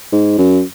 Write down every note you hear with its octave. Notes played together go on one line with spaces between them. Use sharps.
G#2
F#2